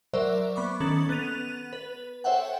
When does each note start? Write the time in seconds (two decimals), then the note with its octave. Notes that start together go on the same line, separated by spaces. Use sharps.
0.13 F#3 A#4 C5 D5 E5
0.56 B3 B5 C#6 D6
0.80 D#3 C#4 A4 A6 F#7
1.09 B3 F#6 A6 D#7 F7
1.73 B4
2.24 A4 C5 C#5 E5 F#5 G5